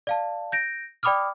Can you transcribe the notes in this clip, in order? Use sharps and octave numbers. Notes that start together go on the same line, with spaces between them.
D5 F5 A5
G6 A#6 D7
D5 G5 B5 D6 D#6 F6